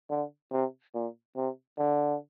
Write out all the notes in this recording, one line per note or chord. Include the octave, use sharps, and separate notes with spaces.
D3
C3
A#2
C3
D3